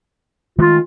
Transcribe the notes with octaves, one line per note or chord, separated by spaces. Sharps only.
D#3 G#3 A3 F4